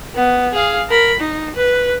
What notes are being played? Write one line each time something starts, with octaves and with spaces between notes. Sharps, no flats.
B3
G#4 F5
A#4 B5
D#4
B4